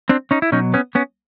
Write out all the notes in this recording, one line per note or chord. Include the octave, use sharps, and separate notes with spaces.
C4 D4
C#4 D#4
E4
B2 F#3 C#4 D#4
B3 C#4
B3 C#4